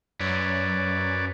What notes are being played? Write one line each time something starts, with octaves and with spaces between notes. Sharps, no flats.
F#2 B4 C#5 D5